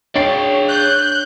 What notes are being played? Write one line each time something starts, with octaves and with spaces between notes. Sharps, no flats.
D4 G#4 C#5 D5 F5 G5
F#6 G6